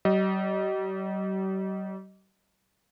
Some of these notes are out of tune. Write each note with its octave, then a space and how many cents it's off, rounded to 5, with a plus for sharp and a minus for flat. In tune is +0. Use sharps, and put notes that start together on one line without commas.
G3 -45 D#5 +0